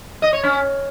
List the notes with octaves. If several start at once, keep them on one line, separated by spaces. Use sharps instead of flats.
D#5
C#5
C#4